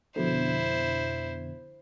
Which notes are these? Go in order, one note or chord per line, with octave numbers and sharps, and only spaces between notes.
F2 B2 D3 E4 C5